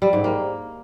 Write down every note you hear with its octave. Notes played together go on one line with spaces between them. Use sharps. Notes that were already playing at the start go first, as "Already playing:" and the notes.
G3
G#2
A#3